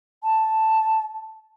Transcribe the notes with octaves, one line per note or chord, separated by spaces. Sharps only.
A5